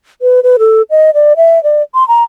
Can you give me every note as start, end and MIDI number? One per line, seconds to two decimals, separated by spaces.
0.22 0.40 71
0.43 0.57 71
0.59 0.82 69
0.90 1.10 75
1.14 1.33 74
1.37 1.62 76
1.63 1.82 74
1.94 2.06 84
2.08 2.24 82